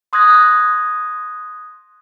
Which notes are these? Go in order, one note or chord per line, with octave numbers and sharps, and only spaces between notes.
C6 D#6 F#6 G#6 A#6